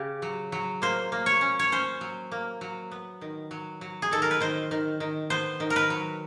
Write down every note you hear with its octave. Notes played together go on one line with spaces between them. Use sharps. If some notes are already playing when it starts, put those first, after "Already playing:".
Already playing: C#3 G4
F#3
F#3
A#3 C5
A#3
C#5
C#4
C#5
C#4 C5
F#3
A#3
F#3
B3
D#3
F#3
F#3
G#4
D#3 A4
A#4
B4
D#3 C5
D#3
D#3
B3 C5
D#3
A#4
B4
F#3